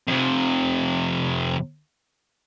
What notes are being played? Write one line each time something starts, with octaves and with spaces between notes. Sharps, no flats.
F2 C3